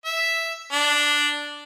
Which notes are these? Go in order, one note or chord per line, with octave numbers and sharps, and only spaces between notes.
E5
D4